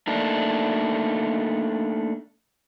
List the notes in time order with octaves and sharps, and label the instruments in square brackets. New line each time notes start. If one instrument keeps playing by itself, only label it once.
[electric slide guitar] A3 A#3 D4 D#4